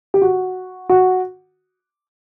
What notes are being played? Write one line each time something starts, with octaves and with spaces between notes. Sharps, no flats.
G4
F#4
F#4